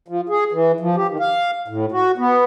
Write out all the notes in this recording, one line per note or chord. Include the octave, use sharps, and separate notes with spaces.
F3
G#4
E3
F3
G4
D#3
F5
A2
F#4
B3